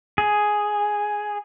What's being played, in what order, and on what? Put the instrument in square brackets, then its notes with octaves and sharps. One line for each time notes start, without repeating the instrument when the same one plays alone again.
[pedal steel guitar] G#4